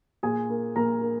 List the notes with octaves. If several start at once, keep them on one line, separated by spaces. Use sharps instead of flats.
A#2 G#4 G#5
A#3
A#2 A#4 A#5
A#3